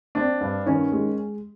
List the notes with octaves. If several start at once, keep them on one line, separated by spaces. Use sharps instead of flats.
C4 D4
G2
D#3 C#4
G#3